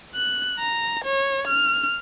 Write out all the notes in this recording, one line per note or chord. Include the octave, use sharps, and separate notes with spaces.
F#6
A#5
C#5
F6